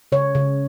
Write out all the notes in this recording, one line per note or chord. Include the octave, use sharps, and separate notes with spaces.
C#3 C#5
C#3